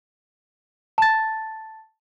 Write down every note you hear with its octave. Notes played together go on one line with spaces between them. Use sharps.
A5 A6